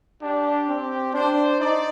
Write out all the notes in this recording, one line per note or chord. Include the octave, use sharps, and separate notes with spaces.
D4 G4
C4
D4 C5
D#4 D5